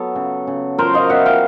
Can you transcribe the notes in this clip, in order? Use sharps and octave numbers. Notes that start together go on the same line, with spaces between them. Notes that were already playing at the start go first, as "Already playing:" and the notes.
Already playing: F#3 B3 A4
C#3
C#3
F#3 A#4 C5
D#5 F5
B3 E5 F#5
F5 G5